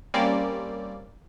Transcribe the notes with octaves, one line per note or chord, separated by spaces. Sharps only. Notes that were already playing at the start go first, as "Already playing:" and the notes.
G3 A#3 C4 C#4 D5